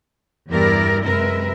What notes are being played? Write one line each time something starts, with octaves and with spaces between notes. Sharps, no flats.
E2 G2 E4 G4 A#4 D5
F#2 C3 G#3 A#4 B4 E5